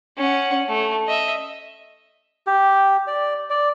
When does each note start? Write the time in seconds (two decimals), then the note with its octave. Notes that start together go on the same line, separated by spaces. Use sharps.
0.17 C#4 F#5
0.68 A3
1.07 D#5 E5
2.47 G4
3.07 D5
3.50 D5